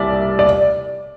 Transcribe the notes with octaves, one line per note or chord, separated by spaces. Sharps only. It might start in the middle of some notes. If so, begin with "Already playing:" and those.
Already playing: C2 G3 D5 E5
D5